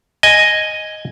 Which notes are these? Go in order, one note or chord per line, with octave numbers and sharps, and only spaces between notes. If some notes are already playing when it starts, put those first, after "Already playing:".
D#5 G#5